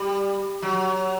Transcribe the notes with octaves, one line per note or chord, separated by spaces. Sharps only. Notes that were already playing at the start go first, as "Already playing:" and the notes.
Already playing: G3
F#3